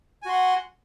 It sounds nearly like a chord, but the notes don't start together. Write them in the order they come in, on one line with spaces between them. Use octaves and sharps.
G#5 F#4 C6 F#5